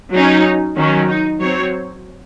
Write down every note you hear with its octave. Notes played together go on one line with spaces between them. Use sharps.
F#3 C#4 D#4
D#3 F#3 C#4
D#4
F#3 C4 C#5